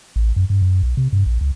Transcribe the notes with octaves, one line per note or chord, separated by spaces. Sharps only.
A1
F#2
G2
F#2
B1
C3
G2
A#1
C#2